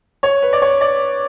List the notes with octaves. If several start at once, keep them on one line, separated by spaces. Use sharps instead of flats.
C#5
B4
D5
C#5
D5